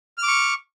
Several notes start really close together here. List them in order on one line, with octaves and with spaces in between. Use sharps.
F6 D6 C#6